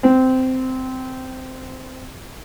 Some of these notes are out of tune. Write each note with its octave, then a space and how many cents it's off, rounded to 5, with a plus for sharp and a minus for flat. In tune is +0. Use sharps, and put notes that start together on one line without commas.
C4 -15